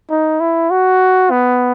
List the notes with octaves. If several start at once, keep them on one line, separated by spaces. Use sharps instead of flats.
D#4
E4
F#4
B3